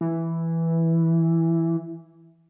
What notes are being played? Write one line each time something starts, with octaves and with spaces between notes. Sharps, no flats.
E3